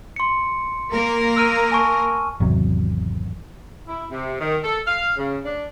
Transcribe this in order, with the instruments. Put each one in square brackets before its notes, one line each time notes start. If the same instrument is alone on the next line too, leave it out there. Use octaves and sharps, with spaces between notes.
[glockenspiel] C6 C#7
[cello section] A#3 A#4
[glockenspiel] E6 F6 D#7
G#5 A5 C#6
[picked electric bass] G#1 E2 C3 F#3
[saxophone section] E4
C3
D#3
A4
F5
C#3
D4